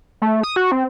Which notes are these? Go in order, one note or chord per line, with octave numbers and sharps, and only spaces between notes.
A3
D#6
F#4
C4